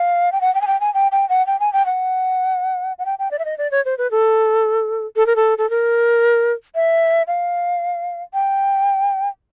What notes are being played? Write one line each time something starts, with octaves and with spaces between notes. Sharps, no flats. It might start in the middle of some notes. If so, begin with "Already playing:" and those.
Already playing: F5
G5
F#5
G5
G#5
G5
G#5
G5
G5
F#5
G5
G#5
G5
F#5
F#5
G5
G5
D5
E5
D#5
D5
C#5
C5
B4
A4
A4
A#4
A4
A4
A#4
E5
F5
G5